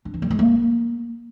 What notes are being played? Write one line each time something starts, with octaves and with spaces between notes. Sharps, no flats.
D4
E3
G3
G#3
A#3